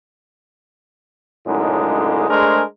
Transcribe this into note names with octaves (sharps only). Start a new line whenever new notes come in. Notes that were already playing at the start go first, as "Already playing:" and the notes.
C#2 F#2 A2 D3 G#3 D#4
G#3 A3 D4 G#4 A#4 C5